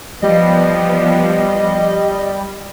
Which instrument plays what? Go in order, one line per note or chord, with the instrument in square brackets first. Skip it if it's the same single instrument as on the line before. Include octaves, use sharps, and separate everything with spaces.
[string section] F3 B3 [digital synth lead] G3 [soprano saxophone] D#5